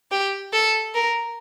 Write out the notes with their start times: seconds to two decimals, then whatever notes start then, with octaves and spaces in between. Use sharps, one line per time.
0.11 G4
0.53 A4
0.94 A#4